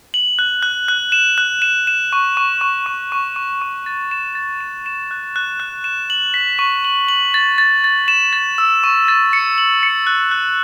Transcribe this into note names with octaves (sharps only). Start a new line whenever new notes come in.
F#7
F#6
F#6
F#6
E7
F#6
E7
E7
C#6
C#6
C#6
C#6
C#6
C#6
C#6
A6
E7
A6
E7
E7
F#6
F#6
F#6
E7
F#7
B6
C#6
F#7
F#7
A6
A6
A6
E7
A6
E6
C#6
A6
C#7
F#7
C#7
F#6
F#6